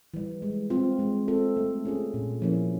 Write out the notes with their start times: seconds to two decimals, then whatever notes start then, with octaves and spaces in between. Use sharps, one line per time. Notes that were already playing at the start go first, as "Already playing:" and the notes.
0.14 E3 G3
0.42 G#3
0.70 C4 F4
0.99 G#3
1.28 C4 F4 A4
1.57 A3
1.85 C#4 F4 G#4
2.14 A#2
2.42 F3 A#3 C#4 E4